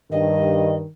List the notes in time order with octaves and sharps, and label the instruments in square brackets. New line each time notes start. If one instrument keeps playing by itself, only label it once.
[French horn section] G2 [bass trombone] D#3 [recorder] D#5